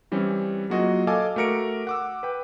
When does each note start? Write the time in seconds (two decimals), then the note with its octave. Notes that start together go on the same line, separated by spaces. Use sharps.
0.11 E3 G3 C4 C#4
0.70 F#3 A#3 F4 F#4 G#4 D#5
1.07 A4 D#5 F5 G#5 A5 D6
1.36 A3 F#4 A#4 C#7 D7
1.87 F#5 D6 E6
2.23 B4 G5